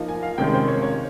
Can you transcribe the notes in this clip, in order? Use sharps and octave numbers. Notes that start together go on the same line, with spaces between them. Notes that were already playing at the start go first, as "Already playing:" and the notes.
Already playing: F3 A#3 D#4
G#5
F5
C3 D#3 G#3 C#4 F4 G5
C5
C#5
C#5